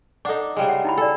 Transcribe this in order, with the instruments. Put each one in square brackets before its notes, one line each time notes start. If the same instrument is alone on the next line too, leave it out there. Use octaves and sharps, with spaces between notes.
[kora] D4 D#4 [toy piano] A4 F#5 D6
[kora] C#3 G3 G#3
[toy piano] F#5
D#4 E4 B5
[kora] A4 [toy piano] D5 G#5